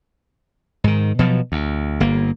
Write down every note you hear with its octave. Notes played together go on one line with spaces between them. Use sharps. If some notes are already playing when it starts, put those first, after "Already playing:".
G#2 D#3
B2 F3 F#3
D2
G1 A#3